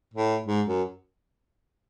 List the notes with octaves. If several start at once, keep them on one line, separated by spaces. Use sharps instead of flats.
A2
G#2
F#2